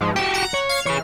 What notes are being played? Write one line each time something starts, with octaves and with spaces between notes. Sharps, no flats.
G#2 F3 G#3
F#4 G4 E5 A5
F#5 A#5
C#5
F5 G#6 C#7
E3 G#4 C#5 F6